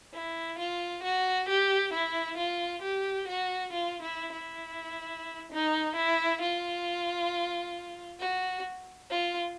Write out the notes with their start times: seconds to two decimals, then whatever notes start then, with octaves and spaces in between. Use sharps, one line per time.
0.13 E4
0.58 F4
1.03 F#4
1.48 G4
1.93 E4
2.37 F4
2.82 G4
3.27 F#4
3.72 F4
4.02 E4
4.32 E4
5.52 D#4
5.96 E4
6.41 F4
8.19 F#4
9.10 F4